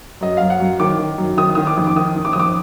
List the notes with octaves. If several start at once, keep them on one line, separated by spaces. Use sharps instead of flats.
F#2 D#5
F#2 F5
F#5
F#2
D#3 D6
D#3
F#2
D#3 D#6
D#3 D#6
D6
F2
D6
D#3 D#6
D#3
D6
D#6
F2 D6